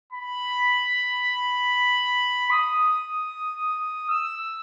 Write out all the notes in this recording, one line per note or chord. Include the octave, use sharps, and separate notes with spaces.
B5
D#6
E6